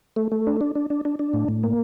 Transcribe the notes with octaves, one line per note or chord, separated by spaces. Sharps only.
A3
A3
D4
D4
D4
D4
D4
D4
A2
A2
A#3